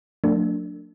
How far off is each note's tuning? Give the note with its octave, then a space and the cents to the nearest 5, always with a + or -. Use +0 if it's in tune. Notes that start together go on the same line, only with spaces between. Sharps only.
F#3 -35 A3 +45 D4 +0